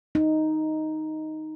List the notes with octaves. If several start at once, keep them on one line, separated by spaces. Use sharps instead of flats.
D#4